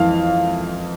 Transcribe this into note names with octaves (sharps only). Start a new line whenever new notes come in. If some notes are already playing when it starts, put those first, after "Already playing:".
Already playing: F2 E3 F5